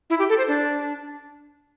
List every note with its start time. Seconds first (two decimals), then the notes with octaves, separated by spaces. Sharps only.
0.10 E4
0.19 G4
0.29 A4
0.38 C5
0.48 D4